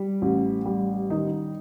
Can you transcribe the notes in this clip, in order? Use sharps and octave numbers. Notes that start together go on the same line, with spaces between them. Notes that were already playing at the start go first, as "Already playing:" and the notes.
Already playing: G3
A1
G3
D#3 D#4